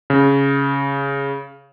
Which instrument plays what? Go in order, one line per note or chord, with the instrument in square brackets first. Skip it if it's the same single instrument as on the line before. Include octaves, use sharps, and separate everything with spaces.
[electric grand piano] C#3